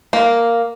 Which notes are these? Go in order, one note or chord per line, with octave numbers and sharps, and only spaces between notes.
A#3